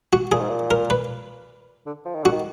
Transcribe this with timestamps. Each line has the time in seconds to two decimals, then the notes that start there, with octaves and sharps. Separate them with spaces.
0.13 F#4
0.32 A#2 G#4
0.40 G#2
0.49 A#2
0.71 A#4
0.90 B4
1.86 D3
2.05 F3
2.14 D#3
2.23 D3 F#4
2.31 D#3